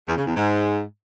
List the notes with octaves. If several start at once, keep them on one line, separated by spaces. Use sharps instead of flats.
E2
C#3
E2
G#2